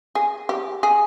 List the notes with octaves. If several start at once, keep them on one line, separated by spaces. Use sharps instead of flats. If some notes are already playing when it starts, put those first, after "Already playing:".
G#4
G4
G#4